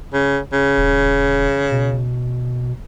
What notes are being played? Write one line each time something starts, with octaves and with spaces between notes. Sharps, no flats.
C#3
C#3
D#1
B2